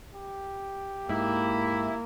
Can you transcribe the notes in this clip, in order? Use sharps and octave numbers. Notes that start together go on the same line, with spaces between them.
G4
G#2 A#3 E4